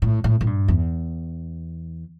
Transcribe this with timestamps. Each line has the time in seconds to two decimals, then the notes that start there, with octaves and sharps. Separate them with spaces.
0.02 A2
0.24 A2
0.41 A2
0.47 G2
0.68 E2